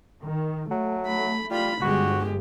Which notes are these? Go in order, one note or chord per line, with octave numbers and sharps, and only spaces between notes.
D#3
F#3 A3
B5
G3 F4 B5
G1 G#3 F#4 G4